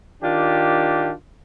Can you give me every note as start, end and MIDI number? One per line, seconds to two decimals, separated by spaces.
0.23 1.13 51
0.23 1.13 62
0.23 1.13 65
0.23 1.13 67